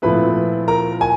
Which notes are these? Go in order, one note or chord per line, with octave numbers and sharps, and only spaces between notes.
A#2 F3 A3 C4 E4 B4 B5
A#4 A#5
G#5